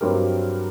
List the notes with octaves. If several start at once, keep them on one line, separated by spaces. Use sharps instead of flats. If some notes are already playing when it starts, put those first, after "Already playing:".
G2 F#3 C4 G4 A#4